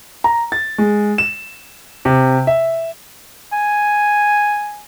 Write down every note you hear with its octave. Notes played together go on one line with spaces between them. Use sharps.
A#5
A6
G#3
E7
C3
E5
G#5